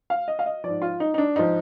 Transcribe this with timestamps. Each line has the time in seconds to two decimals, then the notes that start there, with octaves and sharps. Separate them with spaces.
0.10 F5
0.28 D#5
0.39 F5
0.46 D#5
0.64 G#2 F3 D5
0.82 F4
1.00 D#4
1.14 D#4
1.18 D4
1.36 G#2 F3 D#4